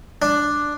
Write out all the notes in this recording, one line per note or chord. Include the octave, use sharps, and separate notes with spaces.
D4